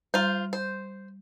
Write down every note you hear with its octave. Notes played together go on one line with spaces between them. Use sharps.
G3 F4 C5 A#5
C5